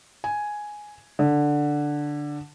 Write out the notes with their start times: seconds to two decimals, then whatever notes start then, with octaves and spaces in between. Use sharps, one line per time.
0.24 G#5
1.19 D3